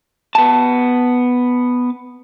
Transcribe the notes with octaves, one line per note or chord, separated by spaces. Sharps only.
B3 A5